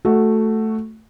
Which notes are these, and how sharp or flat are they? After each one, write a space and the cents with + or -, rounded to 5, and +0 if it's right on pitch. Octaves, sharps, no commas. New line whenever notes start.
A3 +0 F#4 +0